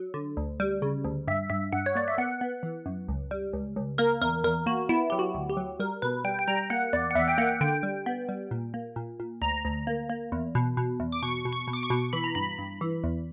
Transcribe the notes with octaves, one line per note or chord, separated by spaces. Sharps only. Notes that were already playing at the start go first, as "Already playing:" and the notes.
Already playing: F#3
D3
D2
G3
C#3
D2
G2 E5
G2 E5
G2 F#5
C#5
A#3 D5
E5
B3 F#5
B3
E3
F#2
C#2
G3
C#2
C#2
A#3 A#4
E2 A#4
E2 A#4
A#3 F#4
B3 E4
F#3 G4
F#4
D2
G4
F#3
G3 A#4
B2 B4
G3 G5
G5
G3 A#5
A#3 F#5
E2 D5
F#5
E2 E5
G5
A#3 F#5
D3 G5
G3
B3
G3
A#2
A#3
A#2
A#2
D2 A#5
D2
A#3
A#3
E2
B2
B2
E2
D6
B2 C#6
B2
C#6
B2
D6
C#6
B2
E3 B5
A#5
G2 B5
G2
E3
E2